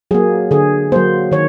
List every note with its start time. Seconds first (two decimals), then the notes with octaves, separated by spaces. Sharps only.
0.11 F#3 A#3 G#4
0.51 D3 G#4
0.92 F#3 A#3 C5
1.32 D#3 C#5